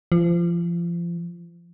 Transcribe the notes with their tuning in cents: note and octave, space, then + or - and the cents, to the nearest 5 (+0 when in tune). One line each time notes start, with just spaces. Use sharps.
F3 -30